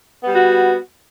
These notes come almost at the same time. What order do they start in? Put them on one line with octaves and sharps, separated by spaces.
B3 G3 F#4